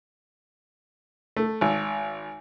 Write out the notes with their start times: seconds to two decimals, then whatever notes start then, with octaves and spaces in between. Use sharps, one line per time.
1.37 A3
1.61 G#1